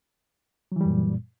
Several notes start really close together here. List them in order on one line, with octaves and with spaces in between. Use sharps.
F#3 E3 G3 F#2 A#2